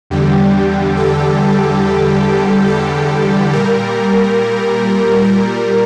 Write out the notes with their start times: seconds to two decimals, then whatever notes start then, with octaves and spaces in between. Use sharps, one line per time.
0.10 E2 D3 G3 G4
0.97 A4
2.68 A4
3.53 A#2 G3 A#4
5.24 A#4